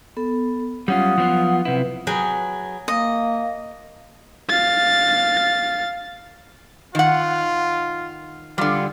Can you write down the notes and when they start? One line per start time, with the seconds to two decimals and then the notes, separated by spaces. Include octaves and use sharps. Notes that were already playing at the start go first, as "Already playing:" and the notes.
0.17 B3 A4
0.88 F#3 G3 C#4 F4 F#5 D#6
1.18 F3 B3 F4
1.65 C3 E4 B4
2.07 F#3 G#4 B4 G5
2.88 A#3 D#5
4.49 F5 A6
6.95 D#3 F4 F#5
8.58 D3 G3 F4